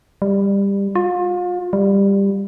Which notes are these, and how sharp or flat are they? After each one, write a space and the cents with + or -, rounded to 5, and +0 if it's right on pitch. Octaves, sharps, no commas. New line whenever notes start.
G3 +20
F4 +35
G3 +15